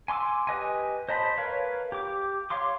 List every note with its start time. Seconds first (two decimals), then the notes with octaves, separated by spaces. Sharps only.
0.08 G#5 C6 D6 E6
0.47 G4 B4 D#5 G#5
1.09 C5 D#5 A5 B5 C6
1.38 A#4 B4 C#5 F5
1.92 G4 D6
2.50 C#5 F5 C6 D6